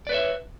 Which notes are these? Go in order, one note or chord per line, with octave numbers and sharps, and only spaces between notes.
B4 C#5 D5 E5